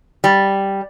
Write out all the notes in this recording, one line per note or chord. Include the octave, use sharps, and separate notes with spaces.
G3